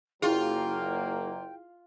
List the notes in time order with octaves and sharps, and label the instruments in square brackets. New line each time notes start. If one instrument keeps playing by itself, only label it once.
[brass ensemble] F#1 F#3 A#3 [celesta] E4 G#4 [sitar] F4 [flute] G5